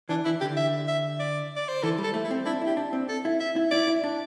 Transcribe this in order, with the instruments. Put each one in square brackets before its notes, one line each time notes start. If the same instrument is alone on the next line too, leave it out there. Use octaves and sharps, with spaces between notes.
[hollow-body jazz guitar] E3 [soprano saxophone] D4
[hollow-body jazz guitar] E3 [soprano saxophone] E4
[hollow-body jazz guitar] D3 [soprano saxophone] G4
[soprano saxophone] E5
E5
D5
D5
C5
[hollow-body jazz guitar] E3 [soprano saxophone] A4
[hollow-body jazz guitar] G3
[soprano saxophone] A4
[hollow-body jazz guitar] A3
[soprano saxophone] E4
[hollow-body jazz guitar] C4
[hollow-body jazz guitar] D4 [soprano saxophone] E4
[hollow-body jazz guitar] E4
[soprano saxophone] G4
[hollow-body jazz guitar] D4
C4
[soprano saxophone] A4
[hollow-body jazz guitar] E4
[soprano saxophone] E5
[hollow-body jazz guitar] E4
[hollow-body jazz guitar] E4 [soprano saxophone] D5
[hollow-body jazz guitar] E4
D4